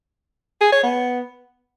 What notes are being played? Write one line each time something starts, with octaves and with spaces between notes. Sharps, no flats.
G#4
C#5
B3